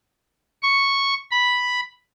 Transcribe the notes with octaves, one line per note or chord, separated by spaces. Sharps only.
C#6
B5